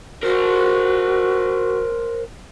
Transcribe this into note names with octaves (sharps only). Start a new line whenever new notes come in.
F#4 A#4 C5